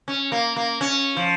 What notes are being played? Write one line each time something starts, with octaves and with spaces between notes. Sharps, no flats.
C#4
A#3
A#3
C#4
F3